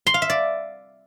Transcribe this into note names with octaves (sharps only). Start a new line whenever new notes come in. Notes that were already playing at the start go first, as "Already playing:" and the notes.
C6
F5
E5
D5